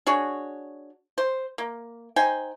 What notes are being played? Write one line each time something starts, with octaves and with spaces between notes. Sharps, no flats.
D4 F#4 G#4 C#5
C5
A#3
D#4 C5 G5 G#5